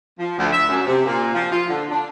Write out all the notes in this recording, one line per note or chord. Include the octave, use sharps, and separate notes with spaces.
F3
D2
E5
F#2
C3
A#2
F3
F4
D3
D4